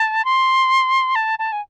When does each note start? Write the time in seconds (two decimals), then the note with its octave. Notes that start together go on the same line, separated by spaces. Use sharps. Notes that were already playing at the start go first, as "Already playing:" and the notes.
Already playing: A5
0.25 C6
1.15 A5
1.39 A5
1.52 G#5